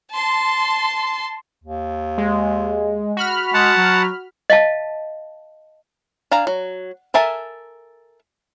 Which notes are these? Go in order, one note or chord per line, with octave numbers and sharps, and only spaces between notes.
A5 C6
D#2
G#3
F#4 B5 F6
G#3 F#5 A5
F#3
D#5 F5 A5
D4 F5 G#5 A#5
F#3
A4 A#4 E5 G#5 A5